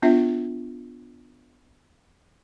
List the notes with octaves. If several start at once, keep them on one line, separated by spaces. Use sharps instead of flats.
B3 D4 F4 E5